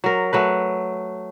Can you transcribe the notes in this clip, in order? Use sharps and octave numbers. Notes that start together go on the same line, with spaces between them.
F#3 A#4
F#3 A3 B4